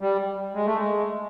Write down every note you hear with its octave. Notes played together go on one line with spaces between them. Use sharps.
G3
G#3
A3
G#3